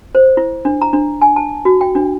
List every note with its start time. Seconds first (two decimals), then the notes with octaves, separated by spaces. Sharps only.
0.15 C5
0.37 E4
0.65 D4
0.82 A#5
0.93 D4
1.22 G#5
1.36 A5
1.65 F#4
1.81 G5
1.95 D4